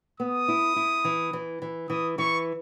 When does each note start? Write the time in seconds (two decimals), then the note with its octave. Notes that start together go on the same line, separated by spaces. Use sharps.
0.20 B3 D#6
0.48 E4
0.76 E4
1.05 E3
1.33 E3
1.62 E3
1.90 E3 D#6
2.18 E3 C#6